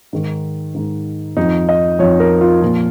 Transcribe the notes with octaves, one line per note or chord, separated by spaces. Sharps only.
G#2 D#3
G#2 D#3
F2 F3 D#4
D#5
F2 F3 C#5
A#4
F4
A#2 F3